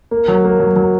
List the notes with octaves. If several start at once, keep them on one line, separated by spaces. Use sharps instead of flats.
A#3
F#3
A#3
F#3
F#3